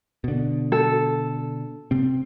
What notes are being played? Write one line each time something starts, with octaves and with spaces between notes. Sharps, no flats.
B2 D3
A4
C3 C4